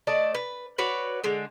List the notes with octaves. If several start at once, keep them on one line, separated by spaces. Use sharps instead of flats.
A3 D5 D#5 A5
B4
F#4 B4 C#5 D5
D3 G#3